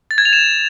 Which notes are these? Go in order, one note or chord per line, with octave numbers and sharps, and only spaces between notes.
A6
G#6
F7
E7